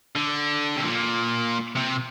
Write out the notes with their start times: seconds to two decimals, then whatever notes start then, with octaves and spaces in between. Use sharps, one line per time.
0.15 D3
0.76 C3
0.85 A#2
1.76 C3